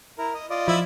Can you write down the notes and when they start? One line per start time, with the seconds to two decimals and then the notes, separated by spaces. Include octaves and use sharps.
0.18 E4 A#4
0.34 D#5
0.50 F4 D5 D#5
0.68 F3 E4 E5